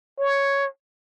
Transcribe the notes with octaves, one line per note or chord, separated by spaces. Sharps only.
C#5